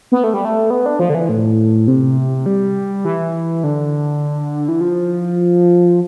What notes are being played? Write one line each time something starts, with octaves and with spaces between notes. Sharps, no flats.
B3
A3
G3
A3
B3
D4
F3
D3
E3
A2
C3
G3
E3
D3
E3
F3